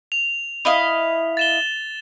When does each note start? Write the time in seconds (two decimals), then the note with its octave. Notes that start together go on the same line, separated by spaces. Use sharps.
0.12 F7
0.65 E4 D#5 F5
1.37 A6 E7 G7